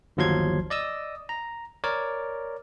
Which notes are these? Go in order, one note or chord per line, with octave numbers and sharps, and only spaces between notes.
G1 D#2 F3 F#3 C6 G#6
D5 D#5 D#6 E6
A#5
A#4 C#5 D5